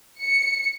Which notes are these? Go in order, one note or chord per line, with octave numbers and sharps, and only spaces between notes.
C#7